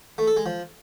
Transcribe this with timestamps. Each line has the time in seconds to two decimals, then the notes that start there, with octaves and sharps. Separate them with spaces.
0.18 A3
0.27 A4
0.37 G#3
0.46 F3